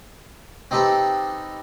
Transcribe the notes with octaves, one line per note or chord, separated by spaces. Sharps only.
C4 D#4 G4 A4 B4